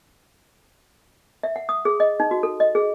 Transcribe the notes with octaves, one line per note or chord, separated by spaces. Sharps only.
E5
F#5
D#6
G#4
D#5
D#4
F#4
A4
D#5
G#4